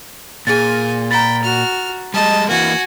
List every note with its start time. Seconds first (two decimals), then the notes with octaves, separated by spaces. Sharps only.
0.47 A#2 G#4 G#5 A6
1.11 G5 A#5 B5 A6
1.44 F#4 F6
2.14 G3 G#3 D#5 A5
2.49 E3 A#3 F#4 G#5